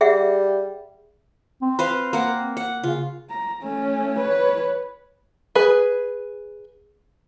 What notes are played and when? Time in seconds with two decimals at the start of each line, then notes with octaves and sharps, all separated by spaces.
0.01 G3 G#4 E5 F#5
1.62 C4
1.79 B4 C5 F5
2.13 A#3 F#5
2.57 F#5
2.83 C#3 F4
3.30 A#5
3.62 A3 C#4
4.19 B4 C#5
5.55 G#4 B4